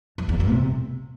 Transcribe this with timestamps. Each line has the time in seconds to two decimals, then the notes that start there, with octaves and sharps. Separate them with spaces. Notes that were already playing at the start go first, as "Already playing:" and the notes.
0.18 F#2
0.29 E2
0.40 F#2
0.51 C3